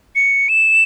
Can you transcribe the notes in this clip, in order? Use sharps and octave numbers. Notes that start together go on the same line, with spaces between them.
C#7
E7